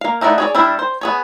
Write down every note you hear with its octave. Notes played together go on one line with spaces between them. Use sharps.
A#3 F5
A3 D#4 E4 D5 F#5
G#4 C#5 D5
G3 D4 E4 E5
C5
B3 G#4 C#5